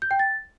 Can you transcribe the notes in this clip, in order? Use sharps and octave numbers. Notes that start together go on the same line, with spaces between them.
G6
G5
A6